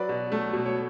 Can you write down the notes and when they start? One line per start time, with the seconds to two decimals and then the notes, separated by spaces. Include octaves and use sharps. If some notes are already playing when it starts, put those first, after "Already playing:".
Already playing: F#3 B4 D5
0.09 B2
0.32 A3
0.53 B2
0.66 C#5